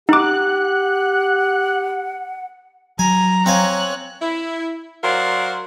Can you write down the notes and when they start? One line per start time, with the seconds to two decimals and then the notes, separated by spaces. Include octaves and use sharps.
0.09 D#4 G4 F#5 D6 F#6
2.99 F#3 G#5 A#5
3.46 C4 C#5 F5 G#5 F#6
4.22 E4
5.04 F#3 A#4 C5 D5 F5